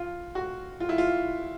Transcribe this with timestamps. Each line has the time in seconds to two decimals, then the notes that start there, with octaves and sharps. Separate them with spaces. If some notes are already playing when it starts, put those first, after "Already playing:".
Already playing: F4
0.35 F#4
0.80 F4
0.89 E4
0.98 F4